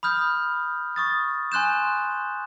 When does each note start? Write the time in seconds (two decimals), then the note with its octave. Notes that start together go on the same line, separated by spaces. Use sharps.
0.03 B5 D#6 F6 G6
0.96 C#6 D#6 A6
1.52 G#5 C6 F#6 G6 E7